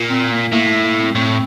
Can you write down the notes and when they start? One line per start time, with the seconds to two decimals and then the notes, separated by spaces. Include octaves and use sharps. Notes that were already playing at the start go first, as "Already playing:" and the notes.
Already playing: A#2
0.10 C4
0.31 A#3
0.53 A2 A#3
0.68 A3
0.84 A#3
1.00 C4
1.15 A2 C4